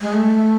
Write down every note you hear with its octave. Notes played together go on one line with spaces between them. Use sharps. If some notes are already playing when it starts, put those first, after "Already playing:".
G#3
A3